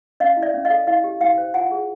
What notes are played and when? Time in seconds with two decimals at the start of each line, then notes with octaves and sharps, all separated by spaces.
0.20 C#4 D#5 F5
0.37 E4
0.42 D5 E5
0.54 C#4
0.65 D#5 F5
0.70 A4
0.87 E4 D#5 F5
1.04 G4
1.21 E4 F5 G5
1.38 C5
1.54 F4 F#5 G#5
1.71 G#4